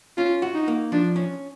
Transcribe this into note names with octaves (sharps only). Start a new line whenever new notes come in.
C#4 F4
F#4
D#4
A#3
F3 D4
C#4